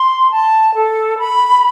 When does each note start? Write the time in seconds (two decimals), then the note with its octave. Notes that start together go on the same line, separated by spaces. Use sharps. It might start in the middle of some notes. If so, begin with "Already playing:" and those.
Already playing: C6
0.31 A5
0.75 A4
1.18 B5